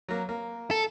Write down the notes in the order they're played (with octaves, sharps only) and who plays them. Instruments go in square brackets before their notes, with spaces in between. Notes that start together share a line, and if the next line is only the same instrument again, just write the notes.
[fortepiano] F#3 A#3
A#3
[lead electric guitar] A4